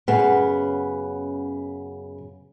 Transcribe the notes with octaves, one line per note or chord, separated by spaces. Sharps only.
F#2 C#3 B3